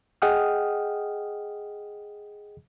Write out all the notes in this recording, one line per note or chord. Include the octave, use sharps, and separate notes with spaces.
G#4 D#5 F#5 G5 D#6 F6